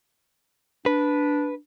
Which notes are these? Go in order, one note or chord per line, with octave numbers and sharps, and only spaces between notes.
D4 B4